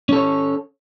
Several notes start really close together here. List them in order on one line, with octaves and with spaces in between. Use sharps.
C#4 A4 C#5